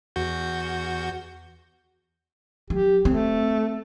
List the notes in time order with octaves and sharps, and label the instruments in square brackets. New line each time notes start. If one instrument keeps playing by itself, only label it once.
[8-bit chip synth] E2 F#4 G6
[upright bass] F#3 [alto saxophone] G4
[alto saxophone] A3 [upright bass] C4